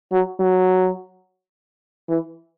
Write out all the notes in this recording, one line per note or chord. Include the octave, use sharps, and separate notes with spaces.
F#3
F#3
E3